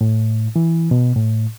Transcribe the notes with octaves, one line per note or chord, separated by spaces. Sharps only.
A2
E3
B2
A2